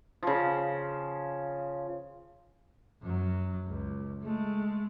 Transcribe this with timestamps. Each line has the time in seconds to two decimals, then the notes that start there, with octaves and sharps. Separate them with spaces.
0.23 C#3 F3
3.02 F#2 F#3
3.67 C#2
4.22 G#3 A3